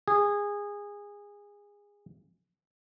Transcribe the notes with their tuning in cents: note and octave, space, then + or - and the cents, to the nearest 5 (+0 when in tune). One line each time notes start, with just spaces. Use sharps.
G#4 -20